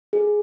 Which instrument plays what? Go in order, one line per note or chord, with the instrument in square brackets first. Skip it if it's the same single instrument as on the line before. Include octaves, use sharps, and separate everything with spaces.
[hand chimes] G#4